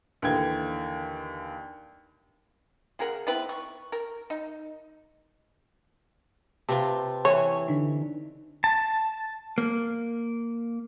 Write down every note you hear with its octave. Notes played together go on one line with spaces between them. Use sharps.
D#2 D3 E3 G5 G#6
C#3 G#4 A#4 F#5
B3 C4 E4 B4
C#6
A#4
D#4
C3 F4 B4 G5 A5
E3 C#5
D3 D4 D#4
A5
A#3